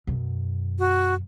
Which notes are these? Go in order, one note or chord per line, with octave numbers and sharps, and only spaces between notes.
F#2 B2
F#4